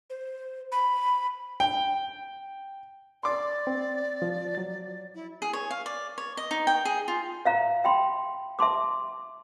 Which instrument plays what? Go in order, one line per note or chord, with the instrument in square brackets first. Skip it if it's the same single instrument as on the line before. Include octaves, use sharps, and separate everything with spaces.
[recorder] C5
B5
[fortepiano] G5
[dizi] D5 [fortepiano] C6 D6
[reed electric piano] C4
F3
F#3 A6
[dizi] E4
[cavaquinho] G#4
C#5
F5
D5
C#5
D#5
D#4
G5
G#4
F4
[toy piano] E5 F5 A#5
E5 G5 B5 C6
E5 A5 C6 D6